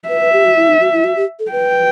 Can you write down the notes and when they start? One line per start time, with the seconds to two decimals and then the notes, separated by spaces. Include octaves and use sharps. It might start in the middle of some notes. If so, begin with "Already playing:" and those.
0.09 B4 E5
0.21 B4
0.33 G4
0.44 F#4
0.56 E4
0.68 D#4
0.80 F#4
0.93 E4
1.04 F#4
1.16 G4
1.39 A4
1.52 B4 G5